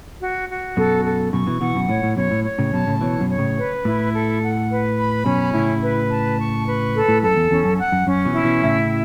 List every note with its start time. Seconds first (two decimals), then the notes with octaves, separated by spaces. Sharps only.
0.21 F#4
0.49 F#4
0.76 F#2 B2 A4
1.05 A4
1.33 F#2 B2 C#6
1.47 B2 E3
1.61 B2 E3 F#5
1.75 F#2 B2
1.89 A2 C#5
2.03 A2
2.17 F#2 B2 C#5
2.31 A2
2.45 C#5
2.59 A2 C#3
2.73 F#2 B2 A5
2.87 A2 C#3
3.01 B2 E3 C#5
3.20 F#2 B2
3.30 C#5
3.38 A2 C#3
3.57 B4
3.85 A2 E4
4.14 A4
4.42 F#5
4.70 B4
4.98 B5
5.26 F#2 B2 C#4
5.53 A2 C#3 E4
5.83 B4
6.10 A5
6.39 C#6
6.66 B4
6.95 A4
7.09 A2
7.23 F#2 A4
7.36 E2
7.50 E2 C#4
7.65 F#2
7.78 F#5
7.92 F#2
8.07 F#2 C#4
8.25 B2 E3
8.34 E4
8.44 B2 E3
8.63 A2 C#3 E5